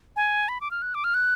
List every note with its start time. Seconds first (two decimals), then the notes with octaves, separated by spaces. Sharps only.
0.16 G#5
0.49 B5
0.61 D6
0.71 F6
0.82 F#6
0.95 D6
1.04 F6
1.14 F#6